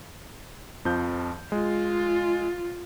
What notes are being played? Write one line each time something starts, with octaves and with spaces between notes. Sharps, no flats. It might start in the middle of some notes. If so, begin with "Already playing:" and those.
F2 F3 G6
G#3 F4